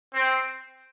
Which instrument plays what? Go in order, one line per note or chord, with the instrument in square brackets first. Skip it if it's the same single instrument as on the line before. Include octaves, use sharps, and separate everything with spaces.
[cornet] C4